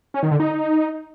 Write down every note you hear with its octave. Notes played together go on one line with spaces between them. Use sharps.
C#4
D#3
D3
D#4